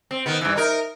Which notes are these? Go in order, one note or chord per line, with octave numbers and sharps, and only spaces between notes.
C4
D#3 B3
G2 E3
D#4 A#4